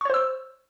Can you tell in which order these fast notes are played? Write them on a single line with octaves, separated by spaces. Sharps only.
C#6 C#5 C5 E6